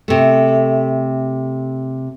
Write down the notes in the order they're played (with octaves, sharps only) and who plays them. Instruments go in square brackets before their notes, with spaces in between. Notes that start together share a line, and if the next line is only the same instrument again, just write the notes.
[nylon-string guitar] C3 A3